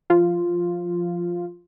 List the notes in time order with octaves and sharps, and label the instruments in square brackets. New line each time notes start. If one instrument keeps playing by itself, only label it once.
[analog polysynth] F3 F4